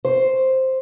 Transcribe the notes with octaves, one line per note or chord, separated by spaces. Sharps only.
C5